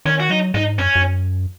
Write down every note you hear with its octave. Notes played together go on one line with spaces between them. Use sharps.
D#3 C#4
F#4
F#3 D#4
G#2 D#4
F#2 C#4
F#2